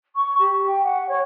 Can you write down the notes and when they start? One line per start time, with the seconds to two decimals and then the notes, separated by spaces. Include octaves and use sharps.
0.16 C#6
0.39 G4
0.66 G5
0.83 F#5
1.09 C#5